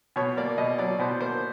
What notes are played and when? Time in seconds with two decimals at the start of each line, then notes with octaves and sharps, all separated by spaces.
0.16 B2 C#5
0.37 A#3 D5
0.58 B2 D#5
0.78 F#3 D5
0.99 B2 C5
1.21 A#3 C5